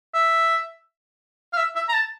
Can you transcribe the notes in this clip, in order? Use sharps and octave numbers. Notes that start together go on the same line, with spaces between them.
E5
F5
E5
E5
A#5
A5